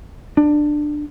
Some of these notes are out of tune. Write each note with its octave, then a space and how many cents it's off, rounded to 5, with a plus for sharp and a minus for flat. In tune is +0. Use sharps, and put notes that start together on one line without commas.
D4 +15